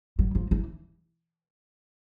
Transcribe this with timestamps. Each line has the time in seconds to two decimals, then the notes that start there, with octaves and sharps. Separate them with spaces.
0.19 F#3
0.35 F3
0.51 E3